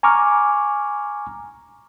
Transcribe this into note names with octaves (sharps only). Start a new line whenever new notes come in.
G#5 A#5 C#6 D6 F6